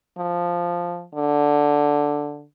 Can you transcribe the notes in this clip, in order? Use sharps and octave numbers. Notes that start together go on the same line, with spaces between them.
F3
D3